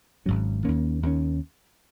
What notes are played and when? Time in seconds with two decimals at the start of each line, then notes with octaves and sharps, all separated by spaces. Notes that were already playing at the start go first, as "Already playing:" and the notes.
0.26 G#1 G#2 F#3 C#4
0.65 D#2 D#3 A#3 C#4
1.03 D#2 D#3 A#3 C#4